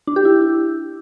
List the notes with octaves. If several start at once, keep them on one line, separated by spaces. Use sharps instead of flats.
D4
G4
E4